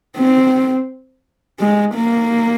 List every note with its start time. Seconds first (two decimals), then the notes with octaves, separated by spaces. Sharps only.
0.17 C4
1.60 G#3
1.95 A#3